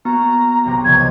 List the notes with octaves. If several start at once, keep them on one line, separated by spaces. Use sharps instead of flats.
A#3 B3 F#4 A#5
B1 C3 A#6
C#2 C#3 F3 G#6